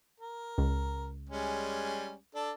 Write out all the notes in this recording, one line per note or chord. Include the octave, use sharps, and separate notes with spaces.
A#4
C#2
G3 G#3 C#4
D4 A4 D5